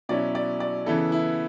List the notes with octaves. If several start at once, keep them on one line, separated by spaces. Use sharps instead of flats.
B2 F#3 C#4 E4 D5
D5
D5
C#3 E3 B3 E4 A4
E4